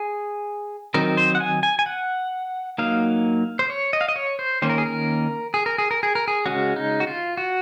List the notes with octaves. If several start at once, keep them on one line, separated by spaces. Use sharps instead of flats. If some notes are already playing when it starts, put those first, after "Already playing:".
Already playing: G#4
D#3 F#3 C4 D#4 A#4
C5
F#5
G#5
G#5
G#5
F#5
F#3 A#3 D#4 F5
C5
C#5
D#5
F5
D#5
C#5
C5
D#3 A#3 C#4 C5
A#4
G#4
A#4
G#4
A#4
G#4
A#4
G#4
A#4
G#4
C#3 G#3 C#4 F#4
D#4
F#4
F4
F#4